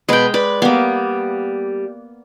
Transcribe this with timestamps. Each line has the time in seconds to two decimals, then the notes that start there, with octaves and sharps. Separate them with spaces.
0.09 B2 G#3 B3 B4 G5
0.34 B4 D5 B5
0.62 G3 A#3 B3